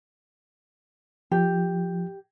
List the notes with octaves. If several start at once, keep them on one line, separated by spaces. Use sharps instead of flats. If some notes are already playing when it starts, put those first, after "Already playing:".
F3 G4